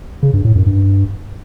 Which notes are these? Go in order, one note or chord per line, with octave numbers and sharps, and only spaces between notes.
C#3
G2
A2
F#2
G2